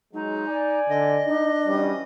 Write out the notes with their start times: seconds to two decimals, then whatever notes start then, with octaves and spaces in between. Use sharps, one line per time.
0.14 F#3 G#3 D#4
0.48 D5 G#5
0.89 D3 D#5
1.27 D4 D#4
1.67 E3 F#3 G3 C#4